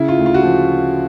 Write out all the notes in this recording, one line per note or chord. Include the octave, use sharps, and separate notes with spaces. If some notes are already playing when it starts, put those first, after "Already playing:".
Already playing: C#3 E4
F4
D2
F4
F#4
F3 F4